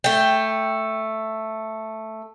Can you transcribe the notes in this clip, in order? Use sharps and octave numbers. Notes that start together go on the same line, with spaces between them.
A3 G5